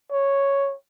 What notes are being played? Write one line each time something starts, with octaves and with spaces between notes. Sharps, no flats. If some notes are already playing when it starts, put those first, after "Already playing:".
C#5